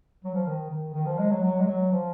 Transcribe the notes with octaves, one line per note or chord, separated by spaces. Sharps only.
F#3
F3
D#3
D#3
D#3
F3
G#3
F#3
F#3
G#3
F#3
F3